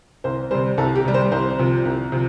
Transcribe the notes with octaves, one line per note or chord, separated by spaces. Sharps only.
C2 C5
C3 G3 C5
C2 A4
G4
C3 G3
C5
C2 C5
C3 F3
C2
C3 F3